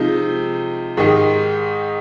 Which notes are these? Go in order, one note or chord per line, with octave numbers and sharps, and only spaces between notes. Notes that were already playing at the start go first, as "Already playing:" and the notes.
Already playing: C3 F3 G#3 D#4
G#2 D#3 G#3 D#4 G4